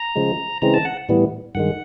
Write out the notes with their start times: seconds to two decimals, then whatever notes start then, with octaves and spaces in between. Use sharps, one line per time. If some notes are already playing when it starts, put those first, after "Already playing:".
Already playing: A#5
0.16 C#3 F3 G#3
0.62 C#3 E3 G#3 C4 A#5
0.74 A5
0.85 F#5
1.09 A2 E3 G3 B3
1.55 G2 D#3 G#3 F#5